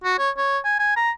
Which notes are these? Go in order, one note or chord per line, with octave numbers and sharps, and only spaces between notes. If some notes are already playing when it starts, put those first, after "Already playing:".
F#4
C#5
C#5
G#5
G#5
A#5